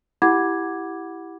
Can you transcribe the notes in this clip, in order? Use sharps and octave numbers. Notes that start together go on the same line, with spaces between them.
E4 G4 F#5 B5 D6 G#6